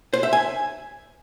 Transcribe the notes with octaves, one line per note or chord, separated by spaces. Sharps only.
C5
E5
G#5